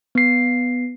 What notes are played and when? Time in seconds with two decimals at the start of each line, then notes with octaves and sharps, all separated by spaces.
0.15 B3 C7